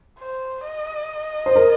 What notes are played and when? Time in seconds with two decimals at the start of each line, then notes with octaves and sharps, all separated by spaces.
0.19 C5
0.65 D#5
1.46 C5
1.56 A#4